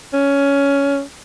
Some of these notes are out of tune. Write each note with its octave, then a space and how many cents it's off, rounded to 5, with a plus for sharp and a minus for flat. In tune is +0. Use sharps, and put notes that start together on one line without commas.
C#4 +15